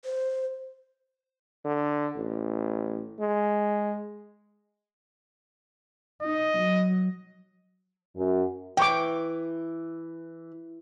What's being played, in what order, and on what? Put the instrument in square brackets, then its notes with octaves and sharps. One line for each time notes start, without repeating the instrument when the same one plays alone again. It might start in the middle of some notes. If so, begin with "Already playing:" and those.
[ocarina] C5
[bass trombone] D3
A1
G#3
[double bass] D#4 [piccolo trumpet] D#5
[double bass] F#3
[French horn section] F#2
[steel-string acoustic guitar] E3 [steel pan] G5 C#6 D6